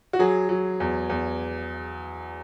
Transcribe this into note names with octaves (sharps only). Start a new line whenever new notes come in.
F#4
F#3 G#4
F#3
E2
E2